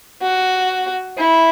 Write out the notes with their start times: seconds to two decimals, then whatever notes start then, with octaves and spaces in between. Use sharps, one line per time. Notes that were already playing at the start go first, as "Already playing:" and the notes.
0.22 F#4
1.18 E4